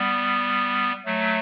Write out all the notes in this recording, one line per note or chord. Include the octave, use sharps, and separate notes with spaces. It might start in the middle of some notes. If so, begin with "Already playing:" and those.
Already playing: G3 B3
F#3 A3